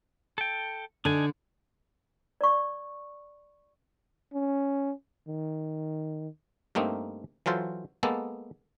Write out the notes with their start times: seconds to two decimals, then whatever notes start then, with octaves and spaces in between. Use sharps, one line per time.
0.38 A4 G5
1.05 D3 D4 D#4 G#5
2.41 D5 C#6
4.34 C#4
5.29 D#3
6.75 G2 A3 A#3 C4 D#4
7.46 E3 F#3 F4 A4 C5
8.03 G#3 A#3 B3 A4